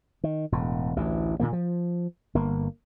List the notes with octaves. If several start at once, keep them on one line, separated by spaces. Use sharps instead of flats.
D#3
E1 A2
A1 D2 E3
A#2 D#3 A#3
F3
G1 A#3